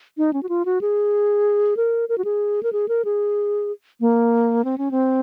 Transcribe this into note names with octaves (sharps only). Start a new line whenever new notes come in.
D#4
C#4
F#4
F4
F#4
G#4
A#4
A#4
F#4
G#4
A#4
G#4
A#4
G#4
A#3
C4
C#4
C4